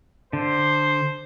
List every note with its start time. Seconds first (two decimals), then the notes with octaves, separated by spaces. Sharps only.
0.33 D3 C5